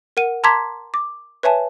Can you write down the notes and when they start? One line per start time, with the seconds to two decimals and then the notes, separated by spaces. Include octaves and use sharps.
0.17 A#4 F#5 D#7
0.44 A5 A#5 C6 D6 G#6 B6
0.94 D6
1.43 B4 C#5 E5 G#5 A5